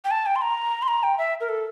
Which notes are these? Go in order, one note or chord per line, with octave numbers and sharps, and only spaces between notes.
G5
A5
G5
C6
A#5
C6
A#5
G5
E5
A#4
A4